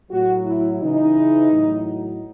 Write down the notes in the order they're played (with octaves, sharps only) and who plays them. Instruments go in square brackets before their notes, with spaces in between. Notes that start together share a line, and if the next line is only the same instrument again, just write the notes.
[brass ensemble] A2 F#3 F#4
E4
C#3 E3 D#4
A2 F#3